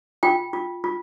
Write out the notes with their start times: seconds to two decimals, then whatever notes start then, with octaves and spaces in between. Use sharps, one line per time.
0.23 F4 G5
0.53 F4
0.84 F4